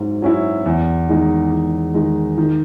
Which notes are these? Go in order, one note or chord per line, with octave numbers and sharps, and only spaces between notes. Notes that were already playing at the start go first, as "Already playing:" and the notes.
Already playing: G#2 F#3 C#4 E4
F#3 C#4 E4
E2
D#3 G#3 D#4
E2
D#3 G#3 D#4
D#3